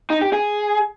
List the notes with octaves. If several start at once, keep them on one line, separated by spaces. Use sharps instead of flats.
D#4
G4
G#4